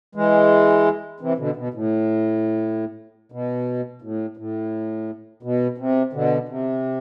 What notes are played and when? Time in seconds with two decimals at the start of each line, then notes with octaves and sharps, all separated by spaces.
0.15 E3 G#3
1.20 C3 E3
1.38 B2 D3
1.56 B2
1.74 A2
3.32 B2
4.02 A2
4.37 A2
5.43 B2
5.78 C3
6.13 B2 D3
6.49 C3